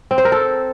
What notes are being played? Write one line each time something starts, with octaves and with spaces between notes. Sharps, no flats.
C4
C5
A#4
A4